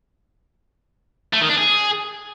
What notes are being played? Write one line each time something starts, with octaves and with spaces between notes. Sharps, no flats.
A3
D#3
D4
G#4